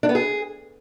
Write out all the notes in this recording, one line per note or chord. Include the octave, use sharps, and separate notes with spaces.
D4
B3
G#4